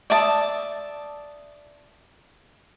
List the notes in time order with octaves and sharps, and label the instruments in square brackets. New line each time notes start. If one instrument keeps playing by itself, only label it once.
[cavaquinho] D5 E5 A5 D#6